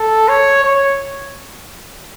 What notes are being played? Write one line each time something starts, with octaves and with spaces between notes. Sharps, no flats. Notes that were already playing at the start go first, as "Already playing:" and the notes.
Already playing: A4
C#5
C#5